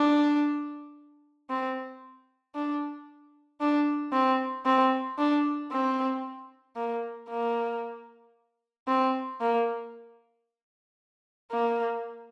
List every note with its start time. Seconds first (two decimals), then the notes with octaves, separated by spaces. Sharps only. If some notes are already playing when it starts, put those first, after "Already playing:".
Already playing: D4
1.50 C4
2.55 D4
3.61 D4
4.13 C4
4.66 C4
5.18 D4
5.72 C4
6.76 A#3
7.29 A#3
8.88 C4
9.41 A#3
11.52 A#3